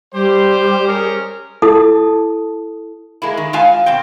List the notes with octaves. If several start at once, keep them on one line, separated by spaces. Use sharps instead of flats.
G3 G4 C5
C#4 G#4 A#4
E4 A4 A5 D#6
G#3 A#3 E4
D#3
G#3 F4 F5 G#5
B2 C4 G5